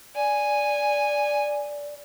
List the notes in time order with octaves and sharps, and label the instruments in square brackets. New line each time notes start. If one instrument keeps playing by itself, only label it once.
[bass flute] D5 [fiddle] G#5